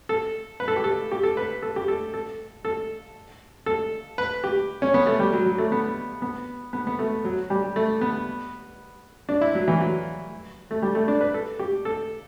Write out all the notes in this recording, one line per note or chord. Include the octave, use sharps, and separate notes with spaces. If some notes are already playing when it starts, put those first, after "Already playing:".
A4
B4
A4
G4
A4
G4
A4
B4
A4
G4
A4
A4
A4
A4
B4
G4
C#4
B3
A3
G3
F#3
F#3
A3
B3
B3
B3
B3
A3
F#3
G3
A3
B3
D4
E4
F#3
E3
F#3
A3
G3
A3
D4
B4
A4
G4
A4